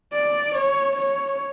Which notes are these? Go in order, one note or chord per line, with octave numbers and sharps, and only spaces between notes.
D5
C#5
C#5